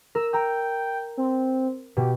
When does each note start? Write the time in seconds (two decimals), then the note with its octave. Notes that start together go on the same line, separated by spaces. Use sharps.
0.15 A#4 E6
0.33 G5 A#5 E6
1.17 C4
1.97 B2 G4